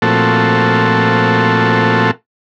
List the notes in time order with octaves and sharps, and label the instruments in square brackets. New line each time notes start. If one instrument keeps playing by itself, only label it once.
[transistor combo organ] A#2 F3 A3 C4 F#4 A4